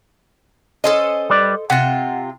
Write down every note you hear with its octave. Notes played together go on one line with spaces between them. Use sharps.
C#4 A4 C5 D#5
G3 B4 D5
C3 F4 F#5